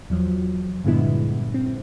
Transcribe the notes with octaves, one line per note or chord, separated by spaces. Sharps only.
E2 F3 F#3
G2 A#2 D3 G#3 B3 E4
C4